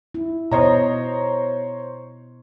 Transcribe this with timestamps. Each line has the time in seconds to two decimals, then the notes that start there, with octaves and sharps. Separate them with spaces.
0.15 E4
0.52 B2 C5 C#5 D#5 A#5